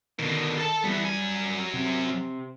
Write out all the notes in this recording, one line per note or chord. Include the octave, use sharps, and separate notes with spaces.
B2 D3 D#3
A4 A5
E3 G3 B3
F#3 G#5
C3